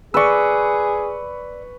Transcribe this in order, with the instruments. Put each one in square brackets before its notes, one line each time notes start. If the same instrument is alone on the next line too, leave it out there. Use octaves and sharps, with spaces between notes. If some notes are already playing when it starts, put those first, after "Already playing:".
[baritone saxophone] G#4 [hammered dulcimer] B4 C#6 [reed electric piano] D5 E6